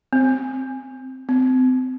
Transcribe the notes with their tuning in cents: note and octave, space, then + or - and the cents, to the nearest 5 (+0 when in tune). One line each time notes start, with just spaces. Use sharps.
C4 -5
C4 -35